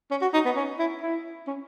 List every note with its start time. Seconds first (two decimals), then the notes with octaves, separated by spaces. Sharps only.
0.11 C#4
0.22 F#4
0.34 D#4
0.45 B3
0.56 C#4
0.79 E4
1.01 E4
1.47 C#4